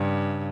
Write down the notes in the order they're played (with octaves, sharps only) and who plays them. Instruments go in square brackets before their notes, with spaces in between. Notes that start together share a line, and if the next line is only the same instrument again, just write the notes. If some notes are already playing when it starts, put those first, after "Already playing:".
Already playing: [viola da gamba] G2 [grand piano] C#3